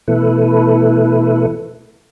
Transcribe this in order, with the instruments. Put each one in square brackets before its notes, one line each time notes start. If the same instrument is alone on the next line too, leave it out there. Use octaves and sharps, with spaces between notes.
[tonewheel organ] B2 E3 A3 E4 A4 B4